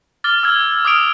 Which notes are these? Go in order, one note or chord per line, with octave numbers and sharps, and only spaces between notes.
D6 F6 A6 G7
E6 F6 G#6
D6 D#6 F6 D7 F7